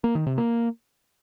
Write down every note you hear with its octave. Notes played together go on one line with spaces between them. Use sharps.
A#3
D#3
C3
A#3